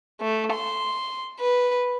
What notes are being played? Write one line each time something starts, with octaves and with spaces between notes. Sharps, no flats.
A3
C6
B4